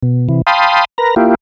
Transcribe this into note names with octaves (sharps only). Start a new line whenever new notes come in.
B2
C3 E3
F5 G5 A5 B5 C6 D#6
A#4 B4 A#5
A#3 E4 F4 G4